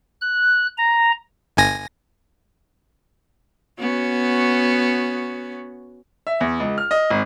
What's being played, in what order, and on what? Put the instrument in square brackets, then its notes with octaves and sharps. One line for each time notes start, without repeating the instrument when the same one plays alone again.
[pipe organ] F#6
A#5
[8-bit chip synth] G1 G#5 A#6
[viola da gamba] B3 C#4 F#4
[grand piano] E5
E2
C#2
F6
D#5
G#1